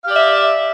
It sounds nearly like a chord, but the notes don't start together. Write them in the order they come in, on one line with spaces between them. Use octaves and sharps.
F5 G4 D5 E5